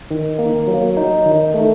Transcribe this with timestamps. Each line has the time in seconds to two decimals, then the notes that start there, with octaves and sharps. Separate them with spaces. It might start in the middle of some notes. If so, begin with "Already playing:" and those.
0.11 D#3
0.39 A#3
0.67 F#3
0.97 D#4
1.26 D#3
1.54 A3